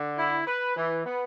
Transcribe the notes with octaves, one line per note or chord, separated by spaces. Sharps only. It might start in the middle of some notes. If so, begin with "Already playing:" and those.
Already playing: D3
E4
B4
E3
B3